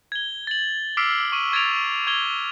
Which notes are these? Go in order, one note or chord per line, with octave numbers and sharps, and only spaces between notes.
G#6 G7
A6 F#7
D6 E6 F6 B6 C7 D7
C#6 D#7 F#7
C#6 G#6 A6 D7 F7
C#6 G#6 F7 G7